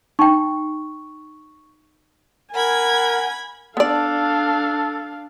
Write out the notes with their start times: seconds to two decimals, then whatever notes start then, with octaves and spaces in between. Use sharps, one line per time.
0.19 D#4 G5 C#6
2.55 A#4 F#5 G#5 B5 G#6
3.77 B3 D4 A4 D5 F5